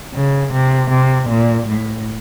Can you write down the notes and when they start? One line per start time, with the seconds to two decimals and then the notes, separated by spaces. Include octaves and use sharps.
0.14 C#3
0.53 C3
0.90 C3
1.29 A#2
1.67 A2